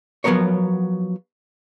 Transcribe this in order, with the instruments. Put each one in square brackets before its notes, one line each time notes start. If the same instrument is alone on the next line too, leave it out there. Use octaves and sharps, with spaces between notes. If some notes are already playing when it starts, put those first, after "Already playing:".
[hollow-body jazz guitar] F3 F#3 A3 B3 A#4 C#5